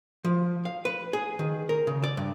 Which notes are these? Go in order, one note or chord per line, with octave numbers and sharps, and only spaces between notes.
F3
F5
B4
G#4
D#3
A#4
C#3
D5
G2